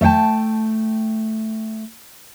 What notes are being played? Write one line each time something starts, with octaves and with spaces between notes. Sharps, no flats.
A3 E5 F5 G5 A5